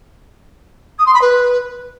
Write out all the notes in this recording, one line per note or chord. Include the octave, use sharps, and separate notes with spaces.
D#6
C6
B5
B4